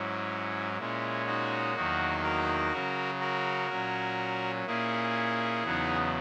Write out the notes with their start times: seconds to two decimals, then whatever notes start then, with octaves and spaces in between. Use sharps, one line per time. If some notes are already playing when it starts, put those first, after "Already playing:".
Already playing: G#2 F#3 C#4 E4
0.78 A#2 G#3 C#4 E4
1.26 D#4 F#4
1.75 E2 D#3 F#3 A#3 D#4
2.23 F#4 A#4
2.73 C#3 F#3 C#4
3.20 F#4 A#4
3.70 A#2 F#3 C#4
4.66 A#2 A#3 C#4 E4 G#4
5.64 E2 C#3 F#3 B3 D#4